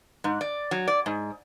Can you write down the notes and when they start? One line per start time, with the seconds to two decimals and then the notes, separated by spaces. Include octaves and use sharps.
0.24 G#2
0.41 D5
0.71 F#3
0.88 D5
1.06 G#2